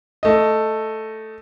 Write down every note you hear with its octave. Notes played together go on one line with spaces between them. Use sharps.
A3 D#5